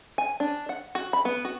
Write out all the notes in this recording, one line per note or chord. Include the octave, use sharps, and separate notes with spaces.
G#5
D4
F#5
F#4
B5
B3
F#4